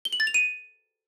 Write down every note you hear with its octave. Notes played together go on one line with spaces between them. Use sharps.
G7
F#7
A6
F7
D#7